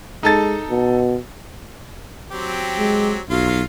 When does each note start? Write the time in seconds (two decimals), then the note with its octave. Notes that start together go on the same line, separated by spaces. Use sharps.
0.23 G#3 D#4 A4 A6
0.70 B2
2.31 F#3 C4 G4
2.78 G#3
3.30 B1 F#3 F4 F5